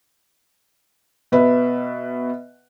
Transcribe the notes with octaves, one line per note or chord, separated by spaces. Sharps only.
B2 B4 E5